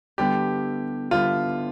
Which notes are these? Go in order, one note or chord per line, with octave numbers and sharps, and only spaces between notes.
D3 G3 B3 E4 G4
D3 G3 B3 E4 F4